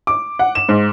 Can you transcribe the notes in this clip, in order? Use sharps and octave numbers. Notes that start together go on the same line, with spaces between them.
D6
F#5
E7
G#2